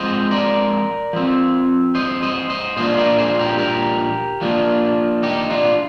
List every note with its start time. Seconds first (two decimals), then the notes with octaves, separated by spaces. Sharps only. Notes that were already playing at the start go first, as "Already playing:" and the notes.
Already playing: F3 G#3 C4 C5 D#5
0.31 A#4 D5
1.13 F3 C4
1.95 C5 D#5
2.22 C5 D#5
2.50 C5 D#5
2.77 A#2 F3 A#3 D4 C5 D#5
2.97 A#4 D5
3.18 G#4 C5
3.39 G4 A#4
3.59 G4 A#4
4.41 F3 A#3 D4
5.23 D#4 G4
5.50 D4 F4